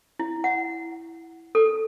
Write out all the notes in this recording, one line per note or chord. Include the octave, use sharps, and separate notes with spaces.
E4
F#5
A4